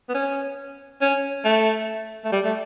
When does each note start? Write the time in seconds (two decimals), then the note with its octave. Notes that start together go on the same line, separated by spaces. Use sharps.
0.09 B3
0.14 C#4
1.01 C#4
1.45 A3
2.25 A3
2.32 G3
2.45 A3